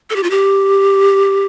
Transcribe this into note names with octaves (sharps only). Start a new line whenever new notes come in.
A4
G4
F4
G4